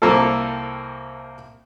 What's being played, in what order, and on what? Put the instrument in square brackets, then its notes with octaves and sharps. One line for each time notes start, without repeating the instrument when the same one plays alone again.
[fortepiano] C2 A#3 C4 F4 A4